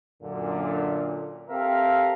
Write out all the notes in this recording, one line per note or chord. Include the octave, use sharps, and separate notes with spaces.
F#2 A#2 D3
C4 G4 A4 A#4 E5 F5